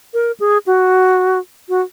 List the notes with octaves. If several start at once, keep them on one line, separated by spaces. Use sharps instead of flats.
A#4
G#4
F#4
F#4